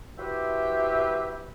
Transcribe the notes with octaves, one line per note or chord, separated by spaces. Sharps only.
E4 F#4 G4 B4 C5 E5